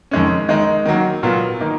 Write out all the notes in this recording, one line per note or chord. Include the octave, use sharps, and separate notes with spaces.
F2 D#3 G#3 C#4
D#3 G#3 D#4
D#3 F#3 A#3
A#2 F#3 B3 F4
D#3 A#3 D#4